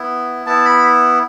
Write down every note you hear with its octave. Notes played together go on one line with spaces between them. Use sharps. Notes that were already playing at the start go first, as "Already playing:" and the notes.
Already playing: B3 E4
B3 E4 A5
B5